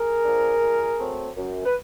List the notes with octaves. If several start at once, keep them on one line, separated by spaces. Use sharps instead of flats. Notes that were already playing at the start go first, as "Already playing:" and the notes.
Already playing: G#4 A#4
F3 A#3 D4
A#2
F#3 A3 C4
F#2
B4